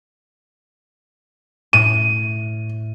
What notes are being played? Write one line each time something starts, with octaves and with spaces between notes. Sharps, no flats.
A2 D#7